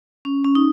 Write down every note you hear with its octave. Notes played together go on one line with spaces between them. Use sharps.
C#4
C#4
D#4